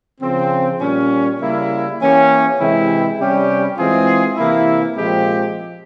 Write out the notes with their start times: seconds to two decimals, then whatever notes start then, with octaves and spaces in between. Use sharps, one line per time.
0.21 C#3 F3 C4
0.80 A#2 G3 C#4
1.40 C#3 G3 A#3 E4
1.99 E3 A#3 C#4 G4
2.58 C3 E3 G#3 C4 E4
3.18 C3 G3 C#4 G4
3.77 E3 G#3 C4 F4 G#4
4.36 C3 E3 A#3 E4
4.96 A#2 F3 G#3 C4 G4